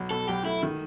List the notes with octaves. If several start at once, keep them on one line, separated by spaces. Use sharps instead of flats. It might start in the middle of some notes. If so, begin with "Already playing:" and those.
Already playing: B1
B2 A4
B1 G4
A3 E4
D#3